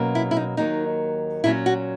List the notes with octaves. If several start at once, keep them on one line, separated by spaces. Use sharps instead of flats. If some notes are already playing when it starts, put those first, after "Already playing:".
Already playing: B2 F#3 A#3 C#4
E4
E4
D#4
D#2 D#3 F#3 A#3 D#4
A#2 F#3 C#4 E4
F#4